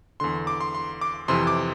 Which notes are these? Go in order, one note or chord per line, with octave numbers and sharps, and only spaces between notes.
E2 D3 C6
D6
C6
C6
D6
F2 C3 E3 C6
D6